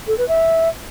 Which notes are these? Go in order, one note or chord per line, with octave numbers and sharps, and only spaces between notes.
A4
B4
E5